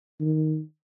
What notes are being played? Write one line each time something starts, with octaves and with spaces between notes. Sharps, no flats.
D#3